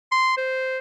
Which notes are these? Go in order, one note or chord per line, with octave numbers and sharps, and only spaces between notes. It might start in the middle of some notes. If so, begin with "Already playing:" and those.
C6
C5